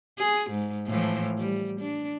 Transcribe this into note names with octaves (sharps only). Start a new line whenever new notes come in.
G#4
G#2
A2 E3 F3
G3
D4